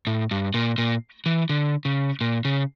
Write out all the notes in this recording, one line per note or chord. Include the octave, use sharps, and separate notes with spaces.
A2
G2
A#2
A#2
E3
D3
C#3
A#2
C#3